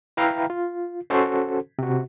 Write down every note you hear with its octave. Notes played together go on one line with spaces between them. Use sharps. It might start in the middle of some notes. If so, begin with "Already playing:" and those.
E4 B4 E5 F5 G5 A#5
F4
C#4 F#4 A4 C5
C3 F#4